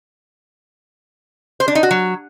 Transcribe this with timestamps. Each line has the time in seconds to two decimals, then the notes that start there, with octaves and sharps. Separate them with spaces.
1.60 C5
1.68 D4
1.75 D#4
1.83 F#4
1.91 F#3